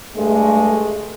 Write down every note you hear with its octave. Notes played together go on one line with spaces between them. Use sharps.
G2 G#3 A3